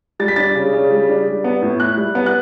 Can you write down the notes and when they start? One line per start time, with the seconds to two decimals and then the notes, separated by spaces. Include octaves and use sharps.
0.20 G3 A6
0.28 B6
0.36 D4 A6
0.55 C#3
0.73 C#3
0.90 G3
1.09 D4
1.26 G3
1.44 B3
1.62 A2
1.80 E4 F#6
1.97 G3
2.15 B3
2.26 F#6